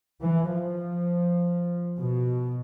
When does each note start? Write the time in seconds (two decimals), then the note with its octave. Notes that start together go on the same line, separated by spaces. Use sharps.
0.21 E3
0.51 F3
1.98 B2